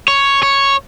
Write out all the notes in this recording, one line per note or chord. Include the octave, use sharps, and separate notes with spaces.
C#5
C#5